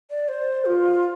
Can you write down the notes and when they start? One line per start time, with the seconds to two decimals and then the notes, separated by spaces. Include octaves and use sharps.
0.10 D5
0.28 C5
0.65 F4